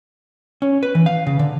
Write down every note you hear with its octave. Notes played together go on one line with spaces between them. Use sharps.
C#4
B4
E3
F5
C#3
D3